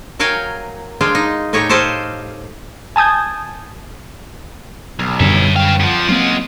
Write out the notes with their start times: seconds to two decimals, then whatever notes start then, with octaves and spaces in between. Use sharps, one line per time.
0.19 F#3 A#4 C#5 F5 G5 G#5
1.01 G#3 D4 F4 F5 G5 G#5
1.15 D#4
1.53 A2 D#4 G4 C#5 G5 A#5
1.69 G4 A4 C5 C#5 D#5 F5
2.96 G#5 A5 D#6 G6 G#6
4.99 B1
5.20 F#2 D3 G3 C#5 E5
5.56 C#4 B4 F5 G5
5.80 F2 F3 F#5
6.09 F#3 G#3 A#3 C4 F4